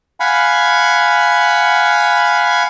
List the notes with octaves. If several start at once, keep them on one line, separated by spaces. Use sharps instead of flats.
F5 F#5 G#5 B5